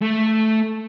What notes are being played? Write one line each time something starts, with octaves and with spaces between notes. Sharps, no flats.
A3